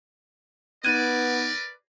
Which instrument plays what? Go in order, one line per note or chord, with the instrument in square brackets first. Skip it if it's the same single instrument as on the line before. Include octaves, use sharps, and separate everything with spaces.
[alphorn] B3 [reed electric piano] D#4 F#6 G#6 [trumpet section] A#4 B4 D5 [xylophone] D#7